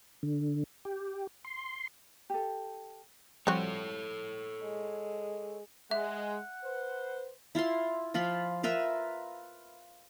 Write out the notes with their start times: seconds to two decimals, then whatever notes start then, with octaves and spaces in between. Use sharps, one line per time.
0.23 D3
0.85 G4
1.44 C6
2.30 G4 A4
3.47 F3 G3 C4 F#4 A4 C#5
4.62 G#3
5.91 G#3 E5 F#5
6.63 B4 C5
7.55 E4 F4 F5 C6
8.14 F3 F4 B5 C6
8.63 F4 A#4 B4 E5